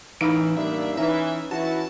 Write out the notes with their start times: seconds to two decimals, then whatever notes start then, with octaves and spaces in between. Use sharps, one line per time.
0.21 A1 E3 D#4 F5 B5 E6 D7
0.57 G3 A#3 D4 E5
0.97 E3 C#4 D#4 B4 E5
1.51 E3 E4 F#4 A5